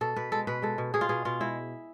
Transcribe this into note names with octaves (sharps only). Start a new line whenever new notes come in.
B2 A4
B2 B4
G#3 A4
B2 B4
G#3 A4
B2
B2 G#4
F4
B2 G#4
B2 F4
G#3 E4